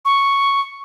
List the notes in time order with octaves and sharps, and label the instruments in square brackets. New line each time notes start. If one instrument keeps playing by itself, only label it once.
[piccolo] C#6